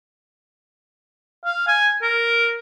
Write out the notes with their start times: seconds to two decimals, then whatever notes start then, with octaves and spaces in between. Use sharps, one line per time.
1.45 F5
1.67 G#5
2.02 A#4